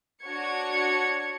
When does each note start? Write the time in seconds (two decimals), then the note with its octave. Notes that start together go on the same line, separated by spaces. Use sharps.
0.23 D4 F#4 C#5 G#6 C#7